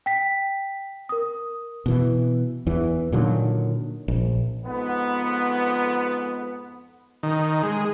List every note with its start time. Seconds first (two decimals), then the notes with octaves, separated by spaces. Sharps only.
0.06 G5 B6
1.09 A#4 D#6
1.86 B2 E3
2.67 E2 E3
3.12 A#2 D3 D#3 F#3
4.08 A#1
4.65 F2 G#2 B3
7.23 D#3
7.63 G#3